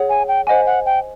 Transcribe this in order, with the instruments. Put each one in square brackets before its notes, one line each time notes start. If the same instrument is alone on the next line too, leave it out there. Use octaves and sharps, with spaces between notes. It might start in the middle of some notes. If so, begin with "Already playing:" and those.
Already playing: [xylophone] G#4 C#5 F#5
[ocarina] G#5
G5
[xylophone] C5 D#5 G#5 [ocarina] F#5
[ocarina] F#5
G5